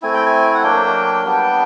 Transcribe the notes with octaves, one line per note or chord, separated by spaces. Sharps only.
A3 C4 E4 G#5
G5
G#5
F#5
F#3 A#3 D4 G5
G3 B3 D4